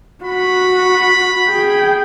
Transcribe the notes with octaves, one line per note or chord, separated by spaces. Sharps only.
F#4 B5
G#4 G5